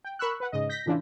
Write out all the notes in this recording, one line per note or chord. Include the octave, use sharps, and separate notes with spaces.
G5
A#4 B5 C#6 E6 F#6
B4 F#5
G#2 C#3 D#5
G6 A#6 B6
A2 C#3 E3 D4 E4 F4